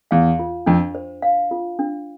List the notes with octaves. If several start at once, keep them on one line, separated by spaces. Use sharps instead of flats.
E2 F5
F4
F2 D4
C5
F5
F4
D4